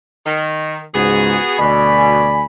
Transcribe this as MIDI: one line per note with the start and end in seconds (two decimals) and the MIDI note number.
0.25 0.83 51
0.94 1.37 37
0.94 1.37 44
0.94 1.56 59
0.94 1.56 66
0.94 1.56 68
1.59 2.44 38
1.59 2.29 47
1.59 2.44 74
1.59 2.44 80
1.59 2.45 83